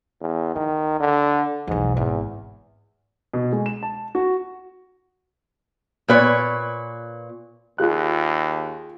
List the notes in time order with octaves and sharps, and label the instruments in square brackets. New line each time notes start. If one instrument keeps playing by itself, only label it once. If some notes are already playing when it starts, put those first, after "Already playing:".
[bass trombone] E2
[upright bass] C#2 [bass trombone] D#3
[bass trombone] D3
[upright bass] B1 E2 [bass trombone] G#2
[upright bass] G#1 [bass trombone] E2
[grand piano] B2
G#3
E7
A5
F#4
[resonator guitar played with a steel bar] A#2 B4 C#5
[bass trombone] D#2 [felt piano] F4 G#4 F#6